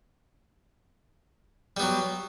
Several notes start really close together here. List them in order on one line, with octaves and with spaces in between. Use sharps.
G3 B3 F#3